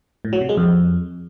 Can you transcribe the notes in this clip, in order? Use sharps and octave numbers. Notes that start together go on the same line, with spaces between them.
A2
F#3
C3
G#3
F2